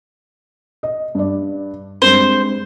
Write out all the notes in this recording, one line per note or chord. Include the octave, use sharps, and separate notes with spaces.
D#5
G2 D5
G2 G#3 C4 C5